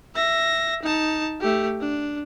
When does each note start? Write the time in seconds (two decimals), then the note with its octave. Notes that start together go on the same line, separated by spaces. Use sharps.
0.15 E5 A#6
0.82 D#4 A5
1.40 A3 G4
1.80 D4